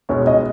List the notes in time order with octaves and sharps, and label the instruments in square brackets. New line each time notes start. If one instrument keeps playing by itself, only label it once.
[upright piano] C#2 B2 G#3 C#4 [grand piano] C#5
[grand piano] D#5